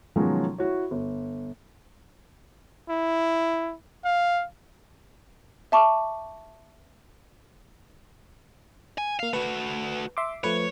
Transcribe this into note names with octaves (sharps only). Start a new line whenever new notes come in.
B2 D#3 F3 F#3 G#3 C#4
E4 F#4 C#5
G1
E4
F5
E5 A5 C#6 D6
G#5
A#3 F5 C7
A3 F#4 B4
E5 C6 D6
F3 A3 B4 C#5